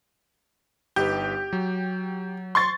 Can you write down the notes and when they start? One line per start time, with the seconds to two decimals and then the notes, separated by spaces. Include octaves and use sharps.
0.96 G1 D#4 G4 B4
1.53 F#3
2.55 C6 C#6 A6